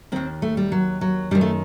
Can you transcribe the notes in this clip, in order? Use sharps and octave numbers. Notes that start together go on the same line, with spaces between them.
D#2 D#3 C4
A3
G3
F#3
F#3
F#2 D#3 G3
A3